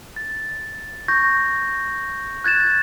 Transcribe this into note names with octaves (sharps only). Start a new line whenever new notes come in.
A6
C#6 G6 A#6
F#6 G#6 A6 E7